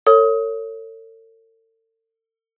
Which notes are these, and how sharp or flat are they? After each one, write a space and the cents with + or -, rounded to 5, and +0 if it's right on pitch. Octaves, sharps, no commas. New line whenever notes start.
A4 +40 C#5 +0 D#6 +25